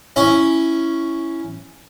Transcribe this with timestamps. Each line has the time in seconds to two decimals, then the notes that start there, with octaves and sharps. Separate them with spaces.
0.16 C#4 E4